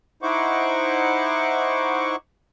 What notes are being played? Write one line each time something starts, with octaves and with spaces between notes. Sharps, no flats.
D#4 E4 C5 F#5 C#6 D6